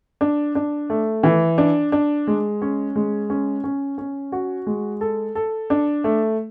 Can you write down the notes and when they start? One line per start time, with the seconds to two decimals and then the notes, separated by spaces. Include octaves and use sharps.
0.21 D4
0.55 D4
0.90 A3
1.23 E3
1.58 D4
1.92 D4
2.27 G#3
2.62 C#4
2.96 G#3
3.30 C#4
3.64 C#4
3.98 C#4
4.32 F#4
4.66 G#3
5.01 A4
5.35 A4
5.70 D4
6.04 A3